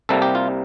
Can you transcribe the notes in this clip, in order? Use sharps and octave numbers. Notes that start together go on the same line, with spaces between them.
C2 C3 G3 A#3 A4
G4
F4